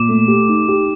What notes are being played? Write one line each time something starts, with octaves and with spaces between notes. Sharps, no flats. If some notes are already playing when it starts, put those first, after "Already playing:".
Already playing: A#2 D6
A3
G4
D#4
G4